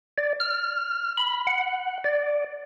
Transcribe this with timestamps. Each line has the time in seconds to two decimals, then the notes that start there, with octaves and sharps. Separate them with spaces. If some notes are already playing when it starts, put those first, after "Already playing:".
0.18 D5
0.40 F6
1.17 B5
1.47 F#5
2.04 D5